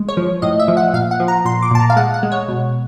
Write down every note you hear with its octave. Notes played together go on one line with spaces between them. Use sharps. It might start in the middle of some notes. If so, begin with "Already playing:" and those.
Already playing: G#3
C#5
F3
A2 D#5
E5
F3
F#5
A#2 F5
F#5
F3
A#5
A#2 C6
D6
A#2 A5
A#5
F5
G#3 F#5
F#5
G#3
C#5
B2